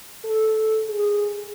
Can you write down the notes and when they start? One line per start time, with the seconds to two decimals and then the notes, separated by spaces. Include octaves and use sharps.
0.24 A4
0.88 G#4